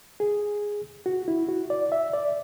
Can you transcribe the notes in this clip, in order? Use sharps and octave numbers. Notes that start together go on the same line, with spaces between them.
G#4
F#4
E4
F#4
D5
E5
D5